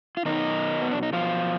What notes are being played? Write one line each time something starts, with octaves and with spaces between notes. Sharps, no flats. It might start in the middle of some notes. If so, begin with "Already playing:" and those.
F4
B2 D#3 F#3 D#4
B3
D4
D#4
B2 F3 F#3 F4